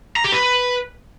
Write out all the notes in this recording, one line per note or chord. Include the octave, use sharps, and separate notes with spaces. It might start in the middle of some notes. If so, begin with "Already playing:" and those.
A#5
G4
B4